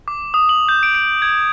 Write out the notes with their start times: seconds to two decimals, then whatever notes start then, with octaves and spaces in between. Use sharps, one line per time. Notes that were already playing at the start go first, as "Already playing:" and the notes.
0.08 D6
0.34 D#6
0.49 F#7
0.69 G6
0.83 D7
0.95 D7
1.22 G#6